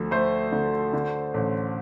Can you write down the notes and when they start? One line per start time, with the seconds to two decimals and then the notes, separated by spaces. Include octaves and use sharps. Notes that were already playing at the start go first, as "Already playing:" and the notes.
Already playing: D2 F3
0.11 A3 C5
0.52 D3
0.93 D3
1.34 A1